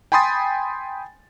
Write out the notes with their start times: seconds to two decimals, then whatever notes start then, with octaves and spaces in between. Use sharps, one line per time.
0.12 G5 G#5 B5 C6 D#6 A6